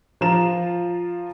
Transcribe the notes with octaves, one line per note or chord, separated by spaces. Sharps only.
F3 F4 A#5 E7